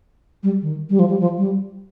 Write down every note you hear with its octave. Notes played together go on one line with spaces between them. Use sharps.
G3
D#3
G3
F3
G3
F3
G3